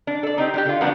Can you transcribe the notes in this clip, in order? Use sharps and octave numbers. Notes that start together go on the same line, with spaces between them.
D4
A4 D5
C4 D#4 G4
G3 D4 G4
D3 F4
F3 G3 A#3 B3 D4 F#4